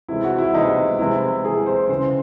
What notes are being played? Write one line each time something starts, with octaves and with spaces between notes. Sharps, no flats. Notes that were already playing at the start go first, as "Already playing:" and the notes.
C3 E3 G#3 E4
F#4
E4
C3 E3 G#3 D#4
C3 E3 G#3 E4
C3 E3 G#3 G#4
C5
C#3 E3 G#3 C5